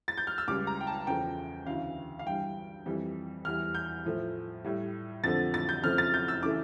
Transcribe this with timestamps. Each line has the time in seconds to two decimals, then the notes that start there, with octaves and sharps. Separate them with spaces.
0.08 A6
0.18 G6
0.27 F6
0.38 E6
0.48 C#2 C#3 G3 D6
0.67 A#5
0.81 G5
0.87 A5
1.07 E2 C#3 F3 A3 G5
1.66 D2 C#3 E3 F5
2.19 F5
2.26 G2 E3 G3 G5
2.86 F2 E3 G3
3.45 E2 E3 G3 F6
3.75 G6
4.05 A2 F3 A3
4.64 A2 G3
5.24 F2 D3 F3 A3 A6
5.54 A6
5.69 G6
5.83 F2 C#3 F3 A3 F6
5.98 A6
6.14 G6
6.28 E6
6.43 C#3 E3 A3 D6